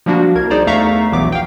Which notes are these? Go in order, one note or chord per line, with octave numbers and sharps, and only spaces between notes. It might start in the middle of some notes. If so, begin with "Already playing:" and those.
F3 G3 A#3 D4 F#4
C2 A#4 G#6
D#4 G#4 C5 D5 A#5
E2 A3 F5 A#5 C#6 B6
A#1 E3 F#3 B3 D6
F5 G5